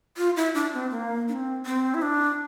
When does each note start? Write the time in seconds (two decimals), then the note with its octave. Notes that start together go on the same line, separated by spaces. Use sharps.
0.17 F4
0.36 E4
0.55 D4
0.74 C4
0.91 A#3
1.28 D4
1.33 C4
1.66 C4
1.94 E4
2.02 D4